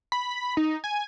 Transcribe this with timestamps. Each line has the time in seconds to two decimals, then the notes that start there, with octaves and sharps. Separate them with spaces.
0.12 B5
0.57 D#4
0.84 G#5